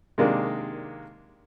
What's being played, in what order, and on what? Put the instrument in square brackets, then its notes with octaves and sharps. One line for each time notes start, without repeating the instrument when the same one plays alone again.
[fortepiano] C3 D#3 G#3 A#3 D4